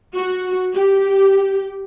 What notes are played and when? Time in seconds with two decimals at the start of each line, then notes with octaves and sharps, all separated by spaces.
0.16 F#4
0.76 G4